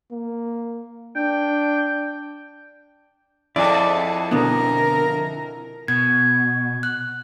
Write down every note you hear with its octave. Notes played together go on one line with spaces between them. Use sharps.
A#3
D4 G5
F2 E4 G#4 A4 D5
B2 D3 B3 A#4
B2 G#6
F#6